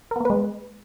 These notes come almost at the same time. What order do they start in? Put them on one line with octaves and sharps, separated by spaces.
A#4 B3 A#3 B4 G#3